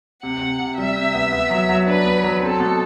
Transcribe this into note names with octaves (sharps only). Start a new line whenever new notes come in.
C3 F#5
C3
C3
G3 E5
C3
B3
B3
F#3
F#3
D4 B4
B3
F#3
C4 A4
B2